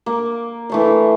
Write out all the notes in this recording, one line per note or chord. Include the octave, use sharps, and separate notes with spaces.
A#3
E3 A3 F5